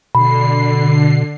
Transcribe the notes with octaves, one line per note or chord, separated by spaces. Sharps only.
B2 D3 B5 C7